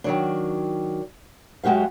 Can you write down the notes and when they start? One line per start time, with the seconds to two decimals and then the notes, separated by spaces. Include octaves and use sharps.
0.04 D#3 F#3 D4
1.63 F#2 G#3 F#4 G4 F5